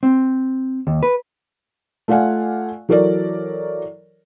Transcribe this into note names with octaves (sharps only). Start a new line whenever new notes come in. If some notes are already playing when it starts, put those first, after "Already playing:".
C4
D#2
B4
A3 F4 D5 F5 F#5 G#5
E3 F#3 A4 A#4 C#5 D5